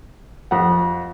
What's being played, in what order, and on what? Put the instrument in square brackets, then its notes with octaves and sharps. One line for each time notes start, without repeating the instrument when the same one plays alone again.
[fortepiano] F2 F#5